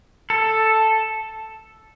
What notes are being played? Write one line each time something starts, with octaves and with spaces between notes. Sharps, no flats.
A4